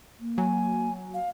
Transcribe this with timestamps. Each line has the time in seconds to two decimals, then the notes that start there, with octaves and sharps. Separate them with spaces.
0.20 A#3
0.38 F#3 G#5
1.14 F5